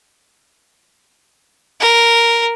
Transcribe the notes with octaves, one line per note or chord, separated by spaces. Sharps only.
A#4